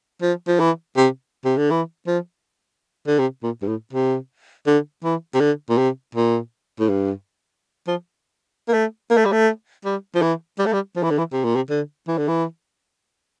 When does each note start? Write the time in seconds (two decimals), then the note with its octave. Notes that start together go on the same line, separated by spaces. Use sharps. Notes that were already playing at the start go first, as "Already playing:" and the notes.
0.22 F3
0.48 F3
0.60 E3
0.97 C3
1.45 C3
1.57 D3
1.71 E3
2.07 F3
3.07 D3
3.19 C3
3.43 A#2
3.62 G2
3.68 A2
3.93 C3
4.67 D3
5.04 E3
5.34 C3
5.40 D3
5.70 A#2
5.78 C3
6.15 A#2
6.79 A2
6.89 G2
7.87 F3
8.68 A#3
8.74 A3
9.10 A#3
9.17 A3
9.25 G3
9.32 A3
9.85 G3
10.15 F3
10.22 E3
10.59 G3
10.66 A3
10.73 G3
10.96 F3
11.03 E3
11.11 D3
11.18 E3
11.32 C3
11.44 A#2
11.56 C3
11.70 D3
12.08 E3
12.18 D3
12.28 E3